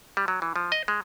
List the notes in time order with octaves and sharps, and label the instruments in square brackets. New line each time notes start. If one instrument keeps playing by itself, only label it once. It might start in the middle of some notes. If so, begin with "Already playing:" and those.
[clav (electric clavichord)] G3
F#3
E3
F3
D#5
G#3